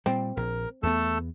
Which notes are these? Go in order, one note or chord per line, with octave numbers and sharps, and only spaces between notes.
A#2 G3 C4
A#1 A#4
E2 A3 B3 A4 E6